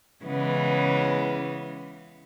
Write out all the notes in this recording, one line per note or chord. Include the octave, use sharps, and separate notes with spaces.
C#3 E3 G#3 B3 C#4